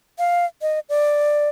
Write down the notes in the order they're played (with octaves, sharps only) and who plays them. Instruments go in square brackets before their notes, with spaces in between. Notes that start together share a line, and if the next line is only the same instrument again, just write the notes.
[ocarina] F5
D#5
D5